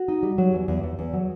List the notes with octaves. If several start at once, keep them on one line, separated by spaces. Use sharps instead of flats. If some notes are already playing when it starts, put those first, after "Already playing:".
Already playing: F#4
D#4
G3
F#3
E2
E2
E2
E2
F#3